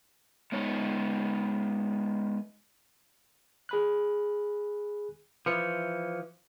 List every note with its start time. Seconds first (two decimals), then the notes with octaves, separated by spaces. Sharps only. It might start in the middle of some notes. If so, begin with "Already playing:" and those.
0.52 G#3 B3 D#4 C#5
3.69 G#4 B5 F#6
5.46 E3 F3 B4 C#7